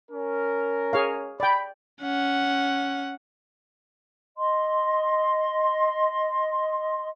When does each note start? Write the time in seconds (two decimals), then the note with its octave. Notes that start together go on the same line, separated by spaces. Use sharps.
0.11 C#4 A#4
0.93 G#4 C#5 F5
1.40 D5 G5 B5
2.01 C#4 F#5
4.37 D#5 C6